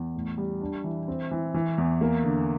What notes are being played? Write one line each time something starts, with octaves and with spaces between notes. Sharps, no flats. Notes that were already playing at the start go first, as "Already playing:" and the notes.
Already playing: E2
A2
G3
D4
E3
C4
E3
E3
E2
A#3
D3